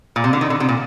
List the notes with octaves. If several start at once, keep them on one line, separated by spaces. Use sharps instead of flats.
A#2
C3
D3
D#3
D3
C3
A#2